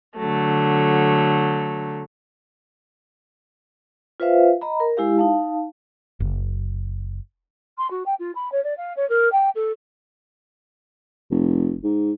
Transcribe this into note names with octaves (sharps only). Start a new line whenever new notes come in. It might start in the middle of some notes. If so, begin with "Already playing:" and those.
D3 F#3 A3
F4 B4 C5 E5 F5
D#5 A#5 B5
A#4
G#3 E4 G4 F5
D#4 F5 A5
F#1
C6
F#4
G5
F4
B5
C#5
D5
F5
C#5
A#4
G5
A4
F1
G#2